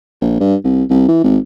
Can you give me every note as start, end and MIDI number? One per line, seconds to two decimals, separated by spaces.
0.21 0.38 34
0.40 0.56 43
0.64 0.84 36
0.90 1.08 36
1.09 1.22 52
1.24 1.38 32